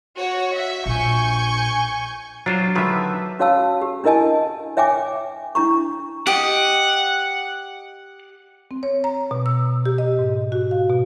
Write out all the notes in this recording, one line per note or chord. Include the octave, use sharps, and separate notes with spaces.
F#4 C#5
E5
A#1 G#5 C#6 G6
F#3 D4 F4 C5
D3 D#3 F4 B4 E5
C#4 F#4 C#5 F5 A5 E6
G4
D4 E4 A#4 D#5 G#5 A5
C#5 E5 G5 G#5 D6
D4 E4 A#5 C#6
G4 D#5 F#5
C4
C#5
A#5
B2
E6
G4
D#5
G#2
F#4
F5
B2